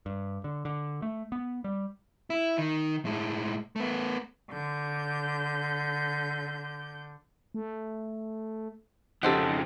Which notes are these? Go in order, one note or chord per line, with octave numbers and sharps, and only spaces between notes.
G2
D3
D3
A3
B3
G3
E4
D#3
A2 G#3
A3 B3
D3 G6
A3
F2 C#3 D#4 G4 A4 C5 D#5 F#5